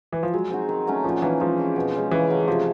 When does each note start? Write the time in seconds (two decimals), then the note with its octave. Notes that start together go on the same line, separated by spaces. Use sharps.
0.13 E3
0.23 F3
0.33 F#3 G#3
0.50 C4 D#4 F#4
0.69 D#3
0.87 F#3 A3 C#4
1.04 A#2 F3
1.22 E3 F#3 A#3 D#4
1.40 F3 G#3
1.58 C4 D#4 G4
1.76 B2
1.94 G#3 C#4
2.11 C#3 E3
2.30 F#3 A3 C#4
2.48 C3 F3